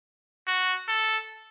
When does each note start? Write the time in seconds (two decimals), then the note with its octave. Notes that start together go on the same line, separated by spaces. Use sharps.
0.47 F#4
0.88 A4